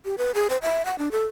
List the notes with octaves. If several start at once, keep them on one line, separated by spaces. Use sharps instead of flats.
G4
B4
G#4
C5
E5
F#5
D4
A4